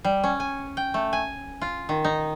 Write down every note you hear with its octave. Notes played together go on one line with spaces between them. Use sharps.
G3
C#4
G#5
G5
A3
G#5
F4
D#3
D#4